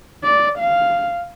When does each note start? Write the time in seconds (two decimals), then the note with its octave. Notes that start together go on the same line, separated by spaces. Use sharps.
0.24 D5
0.59 F5